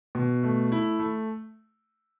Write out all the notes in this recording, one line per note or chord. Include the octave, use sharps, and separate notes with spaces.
B2
A3
E4
A3